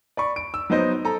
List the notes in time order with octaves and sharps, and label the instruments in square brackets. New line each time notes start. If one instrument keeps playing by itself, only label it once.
[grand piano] D5 B5 C#6
D7
E6
F#3 B3 D#4 C5 D#5
A4 A#5